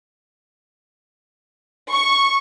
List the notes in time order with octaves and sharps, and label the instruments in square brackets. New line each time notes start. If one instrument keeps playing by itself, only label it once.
[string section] C#6